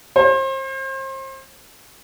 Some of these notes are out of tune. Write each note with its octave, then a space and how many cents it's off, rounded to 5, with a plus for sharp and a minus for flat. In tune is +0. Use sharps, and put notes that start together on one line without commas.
C5 +35